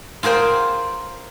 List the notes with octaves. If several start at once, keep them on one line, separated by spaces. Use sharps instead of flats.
F4 G#4 A#4 C5 G5